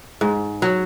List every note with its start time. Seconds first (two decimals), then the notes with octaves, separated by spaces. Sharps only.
0.21 G#2
0.62 F#3